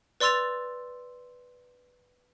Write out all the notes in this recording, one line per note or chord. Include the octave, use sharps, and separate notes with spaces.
B4 D5 C6 E6 A6 F7